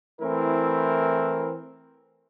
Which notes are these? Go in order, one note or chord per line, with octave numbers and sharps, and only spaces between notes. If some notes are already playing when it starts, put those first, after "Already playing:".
E3 A3 C4 E4 A#4